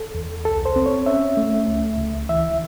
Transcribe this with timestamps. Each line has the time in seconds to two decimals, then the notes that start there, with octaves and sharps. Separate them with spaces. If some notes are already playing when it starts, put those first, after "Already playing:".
Already playing: A4
0.15 E2
0.45 C2 A4
0.65 C5
0.76 C4
0.86 C#5
1.06 C#4 E5
1.37 A3
1.68 C#2
1.98 C#2
2.29 E3 E5